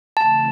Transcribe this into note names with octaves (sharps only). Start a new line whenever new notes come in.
C#3 E3 A3 C4 A5